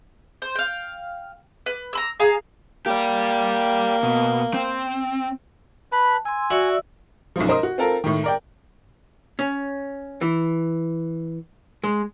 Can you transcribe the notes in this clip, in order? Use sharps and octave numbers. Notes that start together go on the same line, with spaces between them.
C5
F5 G5
B4
A#5 B5 E6
G#4 F5 A#5
A#3 G4 D5
B2
C4
B4 A5 B5
G#5 C6 E6
F#4 D5 E5 E6
B1 F#2 F3
A#4 C5 D#5 D#6
F#4
C4 F4 A4 A#4
A2 D#3
A#4 D5 G5
C#4
E3
G#3